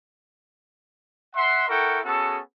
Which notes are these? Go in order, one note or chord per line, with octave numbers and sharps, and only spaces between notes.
E5 F#5 C6
E4 A4 A#4 F#5 G5 C#6
B3 C#4 F#4 G#4 A4